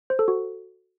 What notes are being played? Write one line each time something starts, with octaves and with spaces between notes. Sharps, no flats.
C5
A4
F#4